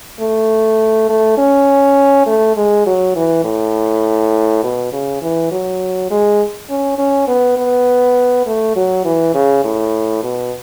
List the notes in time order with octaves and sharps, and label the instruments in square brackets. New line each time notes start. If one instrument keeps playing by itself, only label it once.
[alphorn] A3
A3
C#4
A3
G#3
F#3
E3
A2
B2
C#3
E3
F#3
G#3
C#4
C#4
B3
B3
A3
F#3
E3
C#3
A2
B2